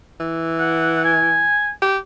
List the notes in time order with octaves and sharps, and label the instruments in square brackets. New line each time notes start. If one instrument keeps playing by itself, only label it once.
[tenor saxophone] E3
[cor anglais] F#5
G#5
[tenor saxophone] G4